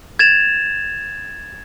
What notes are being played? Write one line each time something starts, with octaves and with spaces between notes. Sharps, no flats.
G#6 A6 E7 F7